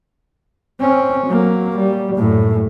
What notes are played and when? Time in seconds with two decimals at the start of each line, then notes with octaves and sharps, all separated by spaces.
0.80 C4 C#4
1.27 F#3 A#3
1.78 G3
2.16 F#2 A2